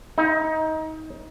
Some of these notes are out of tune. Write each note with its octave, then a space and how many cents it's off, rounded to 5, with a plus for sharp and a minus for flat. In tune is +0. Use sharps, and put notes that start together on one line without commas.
D#4 +25